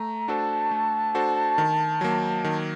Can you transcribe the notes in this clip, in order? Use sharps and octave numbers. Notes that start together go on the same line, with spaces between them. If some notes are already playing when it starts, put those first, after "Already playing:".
Already playing: A3 A#5
D4 F#4 A4 C5 A5
A3
D4 F#4 A4 C5
D#3
F#3 A#3
D#3